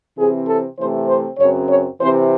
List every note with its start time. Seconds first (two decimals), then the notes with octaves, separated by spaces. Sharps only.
0.18 C3 E3 C4 G#4
0.48 A4
0.78 C3 E3 A3 C4 C5
1.09 C5
1.39 F#2 C#3 F#3 C4 C#5
1.69 C#5
1.99 C3 E3 C4 C5